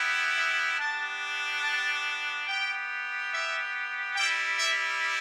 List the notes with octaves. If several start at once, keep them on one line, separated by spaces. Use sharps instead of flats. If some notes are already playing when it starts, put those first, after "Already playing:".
Already playing: B3 E4 G4
E5
B3 D4 G4 A5
A5
B3 G4 G5
E5
G3 E4 G4 G5
E5